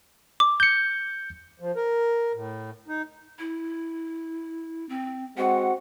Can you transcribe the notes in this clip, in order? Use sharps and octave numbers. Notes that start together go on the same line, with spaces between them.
D6
G6 C#7
F3
A#4
A2
D#4
E4
C4
G#3 C4 F#4 F#5